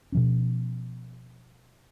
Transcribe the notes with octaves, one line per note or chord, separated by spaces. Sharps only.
B2 F3 C#4